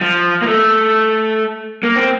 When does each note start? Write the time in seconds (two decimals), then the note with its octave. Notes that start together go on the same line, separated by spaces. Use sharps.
0.01 F3
0.42 A#3
0.47 A3
1.83 A#3
1.96 C4